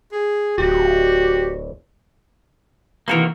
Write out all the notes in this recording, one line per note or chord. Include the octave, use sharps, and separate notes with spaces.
G#4
D1 F#4 G4
C3 D#3 E3 A#3 F#4 A#4